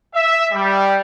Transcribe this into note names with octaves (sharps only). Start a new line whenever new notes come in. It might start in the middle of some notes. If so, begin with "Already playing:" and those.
E5
G3